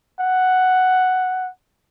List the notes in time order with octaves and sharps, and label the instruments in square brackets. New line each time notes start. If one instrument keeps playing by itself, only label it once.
[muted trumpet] F#5